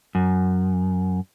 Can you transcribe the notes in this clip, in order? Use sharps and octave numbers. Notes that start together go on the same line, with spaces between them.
F#2